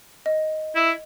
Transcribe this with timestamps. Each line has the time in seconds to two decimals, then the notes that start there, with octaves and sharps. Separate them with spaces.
0.26 D#5
0.76 E4